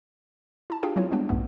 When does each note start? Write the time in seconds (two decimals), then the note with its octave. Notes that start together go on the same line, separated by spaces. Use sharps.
0.70 E4 A5
0.83 D4 F4 G4 G#4 F5 G5
0.96 F#3 B3 C4 E4 F4 C#5
1.11 G3 G#3 B3 D4 G5
1.29 B1 F2 G#2 A3 B3